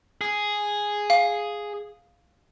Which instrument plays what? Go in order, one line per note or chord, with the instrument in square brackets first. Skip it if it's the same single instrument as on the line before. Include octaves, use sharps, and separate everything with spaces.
[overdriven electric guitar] G#4
[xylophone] F5